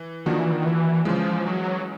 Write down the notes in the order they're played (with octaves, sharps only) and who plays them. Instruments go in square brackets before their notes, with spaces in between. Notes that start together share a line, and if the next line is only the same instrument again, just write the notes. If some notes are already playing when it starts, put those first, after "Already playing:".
Already playing: [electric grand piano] E3
[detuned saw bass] D#3 [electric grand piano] F3 A#3 D4 F#4
[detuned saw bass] E3
D#3
E3
[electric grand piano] C#3 E3 G#3 [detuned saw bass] F3
[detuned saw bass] F#3